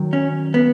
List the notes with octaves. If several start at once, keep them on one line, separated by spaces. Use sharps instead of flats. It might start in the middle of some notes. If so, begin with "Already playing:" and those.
Already playing: F#2 D#3 F#3
C#4
B3